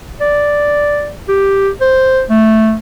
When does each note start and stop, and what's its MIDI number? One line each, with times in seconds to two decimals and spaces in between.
0.21 1.12 74
1.28 1.69 67
1.81 2.23 72
2.30 2.76 57